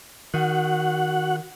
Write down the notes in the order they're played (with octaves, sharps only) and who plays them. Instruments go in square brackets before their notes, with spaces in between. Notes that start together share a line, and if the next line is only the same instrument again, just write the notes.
[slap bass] D#3 [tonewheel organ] F#4 F#5